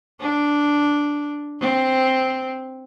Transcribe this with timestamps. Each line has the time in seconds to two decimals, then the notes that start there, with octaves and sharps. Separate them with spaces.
0.20 D4
1.60 C4